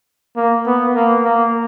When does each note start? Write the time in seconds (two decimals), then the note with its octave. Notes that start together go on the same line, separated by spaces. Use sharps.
0.36 A#3
0.66 B3
0.95 A#3
1.25 A#3